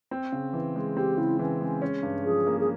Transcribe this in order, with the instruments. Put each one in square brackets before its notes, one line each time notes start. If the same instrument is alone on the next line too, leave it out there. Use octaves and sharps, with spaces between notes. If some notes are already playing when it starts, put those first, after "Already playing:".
[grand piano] C4
C#3
E3
G#3
[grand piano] C4 [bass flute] G4
[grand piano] C#3 [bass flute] E4
[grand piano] E3 [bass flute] C#4
[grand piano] G#3 [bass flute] C#4
[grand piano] C#4
G2
[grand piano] F3 [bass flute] G#4
[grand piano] A#3
[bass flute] G#4